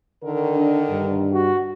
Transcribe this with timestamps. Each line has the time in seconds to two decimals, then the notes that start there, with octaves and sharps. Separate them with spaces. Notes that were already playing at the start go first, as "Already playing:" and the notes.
0.23 D3 D#3 A#4
0.56 D4
0.90 G2
1.33 F#4